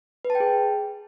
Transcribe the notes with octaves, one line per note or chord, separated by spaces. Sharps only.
B4
A5
G5
G#4